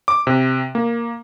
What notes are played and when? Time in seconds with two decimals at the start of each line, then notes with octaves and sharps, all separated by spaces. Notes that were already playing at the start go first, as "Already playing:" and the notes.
0.08 D6
0.27 C3
0.75 A#3